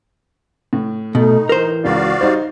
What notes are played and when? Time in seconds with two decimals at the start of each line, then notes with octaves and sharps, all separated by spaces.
0.73 A2
1.15 B2 A3 D#4
1.49 E3 A#4 C5
1.84 C#2 C#3 F#4 D5 F5
2.21 G3 D#4 C5